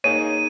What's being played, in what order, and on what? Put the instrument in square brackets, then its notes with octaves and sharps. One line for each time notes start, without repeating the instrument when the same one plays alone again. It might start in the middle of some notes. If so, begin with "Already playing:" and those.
[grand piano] A#3 D#4 G#4 C#5 [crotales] D#7